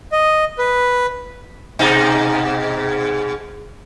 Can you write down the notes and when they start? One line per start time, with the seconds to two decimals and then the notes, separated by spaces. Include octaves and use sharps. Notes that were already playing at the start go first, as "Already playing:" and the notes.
0.12 D#5
0.58 B4
1.79 G#2 B2 D#4